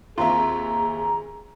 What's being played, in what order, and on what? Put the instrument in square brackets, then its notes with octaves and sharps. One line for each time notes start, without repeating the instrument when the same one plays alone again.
[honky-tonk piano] D#2 C4 E5 [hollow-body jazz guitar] F4 [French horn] G#4 [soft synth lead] A#5